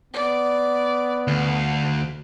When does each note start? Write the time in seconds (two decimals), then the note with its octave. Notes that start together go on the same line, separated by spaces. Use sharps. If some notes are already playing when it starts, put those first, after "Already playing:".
0.14 B3 D5
1.27 D2 F5